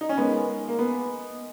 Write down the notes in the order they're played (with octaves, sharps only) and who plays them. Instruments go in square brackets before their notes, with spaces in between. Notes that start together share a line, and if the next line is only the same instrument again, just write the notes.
[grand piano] D#4
C#4
[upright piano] G#3 D#4 A#4 [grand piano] B3
[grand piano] A#3
B3